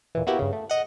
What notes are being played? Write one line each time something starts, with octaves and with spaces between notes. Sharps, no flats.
D#2 A#2 E3
A#3 B3 E4 F#4 G4
G2 C#3
A3
D#5 F#5